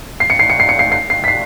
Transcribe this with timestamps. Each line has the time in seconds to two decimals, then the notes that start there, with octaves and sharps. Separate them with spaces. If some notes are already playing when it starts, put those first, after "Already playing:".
0.20 C7
0.30 C#7
0.39 C7
0.50 C#7
0.60 C7
0.69 C#7
0.79 C7
0.92 C7
1.10 C7
1.24 B6
1.28 C7